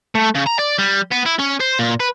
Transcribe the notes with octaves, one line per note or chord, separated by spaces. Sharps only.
A3
C#3
A#5
D5
G3
B3
E4
C#4
C5
A#2
B4